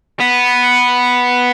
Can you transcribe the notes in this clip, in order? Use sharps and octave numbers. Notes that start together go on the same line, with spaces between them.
B3